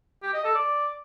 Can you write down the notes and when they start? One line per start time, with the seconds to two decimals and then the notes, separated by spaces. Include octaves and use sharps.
0.23 G4
0.33 D#5
0.44 A4
0.55 D5